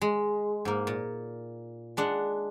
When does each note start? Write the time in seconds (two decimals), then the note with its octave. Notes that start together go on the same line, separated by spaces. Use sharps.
0.02 G#3
0.65 G#2 A#3
0.87 A#2
1.97 G#3 D4 F#5